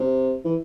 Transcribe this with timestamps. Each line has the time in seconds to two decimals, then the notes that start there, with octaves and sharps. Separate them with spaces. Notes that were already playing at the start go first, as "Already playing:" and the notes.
Already playing: C3
0.44 E3